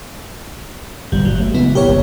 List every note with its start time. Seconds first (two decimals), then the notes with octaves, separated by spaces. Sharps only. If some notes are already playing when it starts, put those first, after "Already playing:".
1.12 G1 A#2 G3
1.25 F#3
1.40 A3
1.54 C#3 G#3 B3 E4
1.75 A#2 G4 A#4 C#5
1.88 F#1